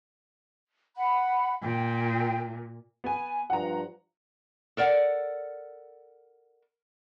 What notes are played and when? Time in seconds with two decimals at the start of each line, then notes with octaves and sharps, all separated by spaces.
0.96 F#5 B5
1.62 A#2 G5
3.04 B3 G#5
3.50 G2 F3 F#5 A#5
4.77 A4 A#4 D5 F#5